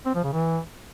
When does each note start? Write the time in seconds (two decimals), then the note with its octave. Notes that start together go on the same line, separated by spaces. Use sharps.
0.06 C4
0.15 F3
0.24 C#3
0.33 E3